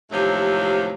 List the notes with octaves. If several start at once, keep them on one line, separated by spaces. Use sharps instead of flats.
D#2 A2 C3 F3 F#3 A3